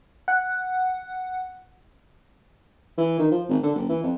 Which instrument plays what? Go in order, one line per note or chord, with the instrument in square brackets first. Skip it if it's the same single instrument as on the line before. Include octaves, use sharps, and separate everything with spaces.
[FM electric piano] F#5
[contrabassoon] E3
D#3
F3
G#1
D3
F#1
E3
F2